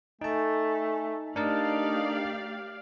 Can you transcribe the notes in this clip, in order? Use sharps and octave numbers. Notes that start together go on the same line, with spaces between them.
A3 D#4 G#5 A5
A3 D4 D#4 G4 A#4 D5 F5 A5